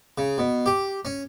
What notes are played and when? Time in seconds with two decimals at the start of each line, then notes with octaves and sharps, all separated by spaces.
0.18 C#3
0.38 B2
0.66 G4
1.05 C#4